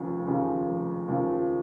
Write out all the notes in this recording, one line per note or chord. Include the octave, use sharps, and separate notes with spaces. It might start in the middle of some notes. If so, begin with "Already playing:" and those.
Already playing: F1 D#2 C#3 F3
D#2 C#3 F3
F1
D#2 C#3 F3